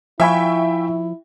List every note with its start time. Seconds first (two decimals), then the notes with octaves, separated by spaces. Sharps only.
0.20 F3 E4 E5 F5 G5 G#5 B5 C#6